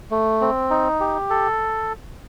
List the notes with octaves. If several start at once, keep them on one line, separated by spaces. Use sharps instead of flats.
A3
C4
D#4
G4
A4